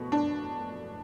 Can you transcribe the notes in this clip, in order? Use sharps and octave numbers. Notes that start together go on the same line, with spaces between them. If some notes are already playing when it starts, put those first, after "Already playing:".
Already playing: B2 C#6
D4